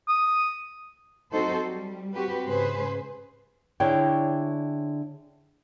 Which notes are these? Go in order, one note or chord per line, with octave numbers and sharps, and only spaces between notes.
D#6
F#3 C4 D#4 F#4 A4 C5
G3
C4 F#4 G4 B4
G#2 C#3 G#4 B4 C5
D3 E4 G#4 C#5 D5 G5